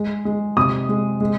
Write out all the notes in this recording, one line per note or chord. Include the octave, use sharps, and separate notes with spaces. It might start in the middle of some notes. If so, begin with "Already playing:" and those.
Already playing: G#3
G#3
C3 D#6
G#3
G#3